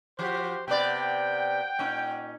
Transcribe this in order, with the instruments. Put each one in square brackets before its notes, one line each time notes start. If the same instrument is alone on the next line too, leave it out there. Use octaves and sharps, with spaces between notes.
[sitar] F3 [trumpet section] F#4 G4 C5
[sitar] C3 B3 D5 [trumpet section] F#5 G5
[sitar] A#2 C#4 D#4